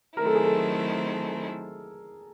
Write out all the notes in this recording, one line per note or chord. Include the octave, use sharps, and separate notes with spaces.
D#3 F#3 A3 C4 E4 A#4
A4
G#4
A4